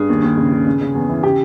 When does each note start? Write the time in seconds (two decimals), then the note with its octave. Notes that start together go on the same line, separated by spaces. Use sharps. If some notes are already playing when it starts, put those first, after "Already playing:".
Already playing: G2 G#4
0.09 D#2
0.23 D#2
0.37 C#3
0.52 C#3
0.67 C#3
0.81 C#3
0.95 E2
1.09 E3
1.23 C#3 G4